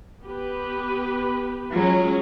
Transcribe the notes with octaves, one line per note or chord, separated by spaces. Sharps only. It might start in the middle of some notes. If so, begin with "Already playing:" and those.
B3 G4 B4
F#3 G#3 C#4 F4